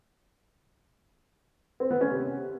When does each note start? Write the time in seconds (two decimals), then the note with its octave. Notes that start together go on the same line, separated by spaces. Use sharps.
1.80 C4
1.91 B3
2.01 C#4
2.11 C3